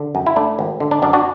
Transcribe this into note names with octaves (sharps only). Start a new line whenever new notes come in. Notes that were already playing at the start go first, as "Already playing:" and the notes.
Already playing: D3
F#2
E4
A3 D4
G#1
D3
D4
F#2 D4
D4 F#4